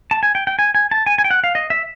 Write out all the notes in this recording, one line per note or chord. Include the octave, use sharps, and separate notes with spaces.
A5
G#5
G5
G5
G#5
G#5
A5
G#5
G#5
G5
F#5
F5
D#5
E5